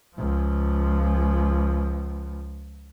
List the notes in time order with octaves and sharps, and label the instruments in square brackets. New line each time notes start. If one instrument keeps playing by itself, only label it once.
[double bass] C#2 F3